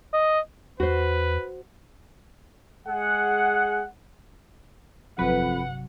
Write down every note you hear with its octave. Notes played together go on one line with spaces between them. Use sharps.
D#5
E2 F#4 B4 C5
G#3 G#4 F#5
G1 F2 C3 F#3 B4 F#5